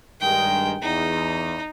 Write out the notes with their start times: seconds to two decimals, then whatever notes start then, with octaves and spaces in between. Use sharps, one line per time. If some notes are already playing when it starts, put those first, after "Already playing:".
0.21 G2 D#3 G#3 G5
0.82 E2 D#4